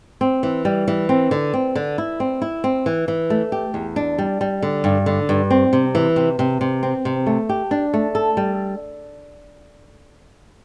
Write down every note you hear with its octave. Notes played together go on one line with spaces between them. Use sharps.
C4
E3
G3
E3
C4
D3
C4
D3
E4
C4
E4
C4
E3
E3
A3
G4
E2
D4
G3
G3
D3
G2
D3
G2
C4
C3
E3
C3
C3
C3
C4
C3
A3
G4
D4
A3
A4
G3